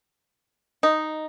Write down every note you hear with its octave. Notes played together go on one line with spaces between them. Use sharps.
D#4